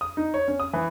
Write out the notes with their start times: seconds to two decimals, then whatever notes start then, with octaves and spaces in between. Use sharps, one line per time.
0.01 D#6
0.17 D#4
0.34 C#5
0.48 C#4
0.60 D#6
0.73 E3